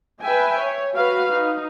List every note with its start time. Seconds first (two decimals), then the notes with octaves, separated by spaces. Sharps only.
0.22 B4 E5 G5 G#5
0.61 C#5
0.95 F#4 B4 F5
1.31 D#4